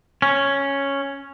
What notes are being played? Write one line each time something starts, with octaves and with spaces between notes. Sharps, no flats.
C#4